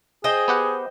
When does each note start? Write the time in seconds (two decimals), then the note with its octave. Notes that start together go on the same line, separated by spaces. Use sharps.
0.24 G#4 C5 D#5 G5
0.48 B3 G4 F#5